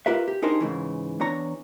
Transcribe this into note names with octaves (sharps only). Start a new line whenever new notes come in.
F4 G4 A#4 B4 E5
G4
D4 D#4 G4 G#4 A#4 C5
G#2 C#3 E3
E2 D4 C#5 A#5